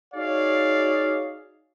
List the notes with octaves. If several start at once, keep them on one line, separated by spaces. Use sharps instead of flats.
D#4 F#4 G#4 C#5 D5 F5